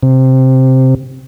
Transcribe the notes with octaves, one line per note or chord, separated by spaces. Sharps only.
C3